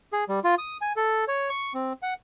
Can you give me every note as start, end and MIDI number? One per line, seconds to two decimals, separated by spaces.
0.13 0.24 68
0.29 0.40 55
0.44 0.55 65
0.58 0.77 87
0.81 0.93 80
0.96 1.25 69
1.28 1.49 73
1.49 1.73 85
1.74 1.93 60
2.03 2.14 78